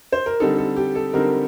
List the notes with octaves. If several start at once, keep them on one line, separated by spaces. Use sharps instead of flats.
C5
A#4
D3 G3 C4 D#4 A4
A4
G4
A4
D3 G3 C4 D#4 A#4